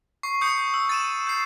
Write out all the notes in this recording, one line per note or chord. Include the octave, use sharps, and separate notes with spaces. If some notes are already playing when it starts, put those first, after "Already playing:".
C#6 C7
D#6 G6 C#7
E6
A6 D#7 E7
G6 C7